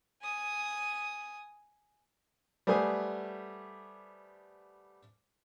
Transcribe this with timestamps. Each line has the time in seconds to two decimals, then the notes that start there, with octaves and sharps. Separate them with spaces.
0.22 G#5 D#6
2.67 G3 A3 B3 C5 G#5 D#6